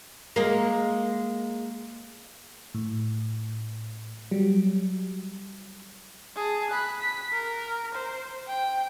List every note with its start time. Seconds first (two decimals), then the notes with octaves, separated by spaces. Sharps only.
0.36 G#3 A#3
2.74 A2
4.31 F#3 G3
6.36 G#4 A5
6.70 B5 F#6
7.01 B6
7.32 A#4
7.94 C5
8.48 G5